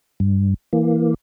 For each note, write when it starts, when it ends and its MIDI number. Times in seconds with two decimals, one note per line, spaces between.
0.20 0.54 43
0.73 1.14 52
0.73 1.14 58